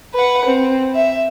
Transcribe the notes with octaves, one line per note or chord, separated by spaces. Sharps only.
B4 F#5
C4
E5